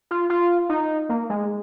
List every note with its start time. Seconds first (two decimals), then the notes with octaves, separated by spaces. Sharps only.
0.11 F4
0.30 F4
0.69 D#4
1.09 A#3
1.30 G#3